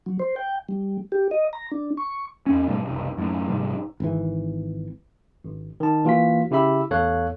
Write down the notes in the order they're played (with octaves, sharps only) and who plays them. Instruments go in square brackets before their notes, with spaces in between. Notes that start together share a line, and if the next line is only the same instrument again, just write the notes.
[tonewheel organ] F#3
C5
G5
G3
G4
D#5
A#5
D4
C#6
[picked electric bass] E2 C4 C#4
G#2 B2 G3 A3
F#1 C2
F#2 A2
A#1 G#2 C3 G3
[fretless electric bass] G#1 E3
[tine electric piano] G#1
D#3 A5
E3 A#3 F4 F#4 F5 B6
C#3 E4 G4 E5 B5 E6
A1 E2 A4 C#5 F5 F#6